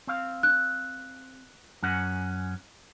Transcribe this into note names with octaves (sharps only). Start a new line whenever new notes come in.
C4 F5
F#6
F#2 C#4 F#5